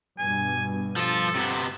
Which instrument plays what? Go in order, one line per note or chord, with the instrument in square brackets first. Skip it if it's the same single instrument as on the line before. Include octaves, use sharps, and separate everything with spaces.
[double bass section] G2 B2 [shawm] G#5
[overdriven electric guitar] F3 F4 [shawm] A4
[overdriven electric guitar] C3 B3